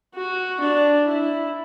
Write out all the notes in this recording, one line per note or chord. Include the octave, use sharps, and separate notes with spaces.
F#4
D4
E4